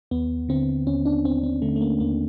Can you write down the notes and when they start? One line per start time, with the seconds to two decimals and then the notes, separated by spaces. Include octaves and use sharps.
0.11 D#2 B3
0.49 D3 C4
0.87 D#2 C#4
1.06 D4
1.25 D#2 C4
1.43 C4
1.62 D3 A3
1.76 A3
1.81 A#3
2.00 D#2 A#3